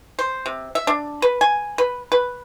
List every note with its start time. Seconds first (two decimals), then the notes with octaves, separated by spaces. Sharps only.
0.19 C5
0.46 C3
0.75 E5
0.87 D4
1.22 B4
1.41 G#5
1.78 B4
2.12 B4